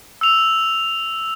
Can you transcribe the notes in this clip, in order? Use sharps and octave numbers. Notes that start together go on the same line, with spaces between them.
E6 F7